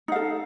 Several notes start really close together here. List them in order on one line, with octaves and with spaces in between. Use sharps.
D#4 F5 A4